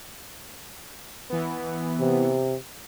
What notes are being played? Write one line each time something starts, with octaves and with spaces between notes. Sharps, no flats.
E3 B3
C3